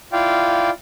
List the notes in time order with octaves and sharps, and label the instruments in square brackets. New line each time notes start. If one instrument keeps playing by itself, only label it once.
[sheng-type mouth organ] E4 F4 D5 F5 G5